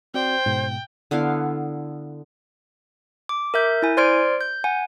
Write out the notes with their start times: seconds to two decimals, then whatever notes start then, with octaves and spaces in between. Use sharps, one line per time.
0.14 C4 F#4 C5 D5 G5
0.46 G#2 B2
1.11 D3 B3 E4 F5
3.29 D6
3.54 A#4 E5 G6
3.82 E4 G#5
3.97 C5 D5 C6 F6 G#6 D7
4.41 G6
4.64 F#5 G#5